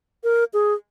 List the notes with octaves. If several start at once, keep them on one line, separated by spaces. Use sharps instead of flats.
A#4
G#4